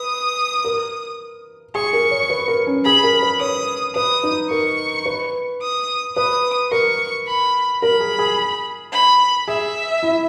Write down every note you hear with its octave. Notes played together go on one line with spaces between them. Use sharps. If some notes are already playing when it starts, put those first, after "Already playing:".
Already playing: B4 D#6
A#4
G#4 C#6
A#4
C#5
B4
A#4
C#4
G#4 B5
A#4
B4
C#5 D#6
B4 D#6
D#4
A#4 C#6
B4
D#6
B4 D#6
A#4 C#6
B5
A#4 B5
G#4
G#4
B5
G#4 E5
E4